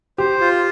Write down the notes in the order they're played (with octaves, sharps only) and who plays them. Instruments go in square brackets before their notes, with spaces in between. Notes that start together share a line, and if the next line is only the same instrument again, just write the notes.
[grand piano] G4 [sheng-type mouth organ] C5
[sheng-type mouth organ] F4